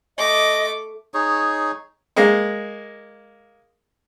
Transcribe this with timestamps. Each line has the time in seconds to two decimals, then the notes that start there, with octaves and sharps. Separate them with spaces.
0.18 A3 D#5 D6
1.14 D#4 G#4 C#5
2.16 G#3 A#3